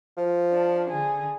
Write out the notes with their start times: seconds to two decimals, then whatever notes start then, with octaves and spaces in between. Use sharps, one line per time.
0.17 F3
0.51 D4
0.88 D3 G#4